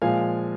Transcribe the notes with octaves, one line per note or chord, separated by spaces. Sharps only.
A#2 F3 G#3 F5 G#5